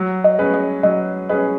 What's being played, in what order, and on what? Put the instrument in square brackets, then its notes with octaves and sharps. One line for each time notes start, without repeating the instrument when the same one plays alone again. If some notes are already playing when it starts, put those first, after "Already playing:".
Already playing: [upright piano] F#3
[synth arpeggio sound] D#5
[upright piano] C#4 G#4 B4
[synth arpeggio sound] D#5
[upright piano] F#3 [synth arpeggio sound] D#5
[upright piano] C#4 G#4 B4 [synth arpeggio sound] D#5